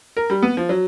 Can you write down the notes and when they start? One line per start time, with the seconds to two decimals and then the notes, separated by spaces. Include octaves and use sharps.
0.17 A#4
0.30 G3
0.43 B3
0.57 F3
0.69 F#3